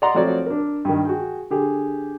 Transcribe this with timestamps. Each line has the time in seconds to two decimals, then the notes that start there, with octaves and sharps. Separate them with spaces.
0.02 D5 D#5 F#5 A#5 C6
0.14 F3 A3 C4 F#4 C#5 D5
0.46 D4 A#4
0.85 G2 D#3
1.05 F#4 G#4 G5
1.50 D3 G4 G#4